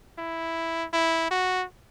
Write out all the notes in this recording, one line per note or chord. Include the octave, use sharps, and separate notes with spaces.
E4
E4
F#4